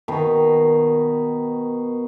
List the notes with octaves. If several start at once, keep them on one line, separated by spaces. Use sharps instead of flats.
B2 D#3 G5